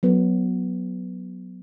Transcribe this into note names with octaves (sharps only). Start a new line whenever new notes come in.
F#3 B3